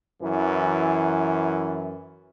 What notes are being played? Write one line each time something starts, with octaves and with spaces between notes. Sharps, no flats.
F#2 E3